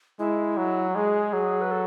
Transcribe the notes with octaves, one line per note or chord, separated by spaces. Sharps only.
G#3 E4
F#3
G#3 G#4
F#3
B4
A4